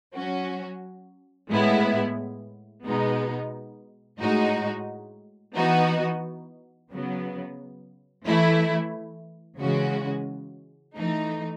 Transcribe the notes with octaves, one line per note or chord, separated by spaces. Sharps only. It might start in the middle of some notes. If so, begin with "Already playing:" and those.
F#3 C#4 F#4
A2 G#3 B3 E4
B2 G#3 B3 D#4
A2 G#3 D#4 F#4
E3 B3 D#4 F#4
C#3 F#3 B3
E3 A3 E4
C#3 E3 G#3 C#4 F#4
E3 A3 D#4